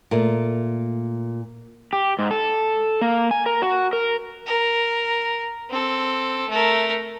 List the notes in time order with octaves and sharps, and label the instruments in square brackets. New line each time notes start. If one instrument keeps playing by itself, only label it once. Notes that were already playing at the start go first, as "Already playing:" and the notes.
[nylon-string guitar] A#2 A3
[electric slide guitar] G4
G#2
A4
A#3
G#5
A#4
F#4
A#4
[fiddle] A#4
C4 A4
A3 A#4